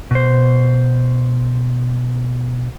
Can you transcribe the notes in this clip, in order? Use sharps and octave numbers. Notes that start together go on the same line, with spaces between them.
B2 C5